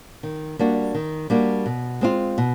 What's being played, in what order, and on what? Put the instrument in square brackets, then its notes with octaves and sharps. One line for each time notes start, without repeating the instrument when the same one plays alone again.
[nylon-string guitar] D#3
G3 A#3 D4 F#4
D#3
G3 A#3 D4 F#4
B2
G#3 C4 F4
B2